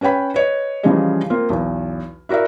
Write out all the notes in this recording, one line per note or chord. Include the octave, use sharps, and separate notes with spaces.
C#4 B4 C#5 G5 B5
B4 C#5 D#5
C#3 E3 F3 G3 G#4 D#5
A#3 C4 F4
B1 E2
E4 F#4 A#4 D5 E5